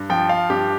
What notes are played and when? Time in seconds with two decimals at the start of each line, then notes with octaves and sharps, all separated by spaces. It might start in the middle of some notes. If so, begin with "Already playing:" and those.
Already playing: G2
0.10 F3 G5
0.29 F5
0.50 G2 G4